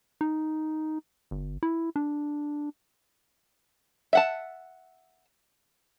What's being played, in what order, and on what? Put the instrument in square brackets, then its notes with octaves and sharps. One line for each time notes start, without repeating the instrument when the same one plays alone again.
[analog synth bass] D#4
G1
E4
D4
[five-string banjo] E5 F#5 A5